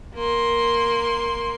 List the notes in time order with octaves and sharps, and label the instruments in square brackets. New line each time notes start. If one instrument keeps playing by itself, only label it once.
[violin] A#3 C6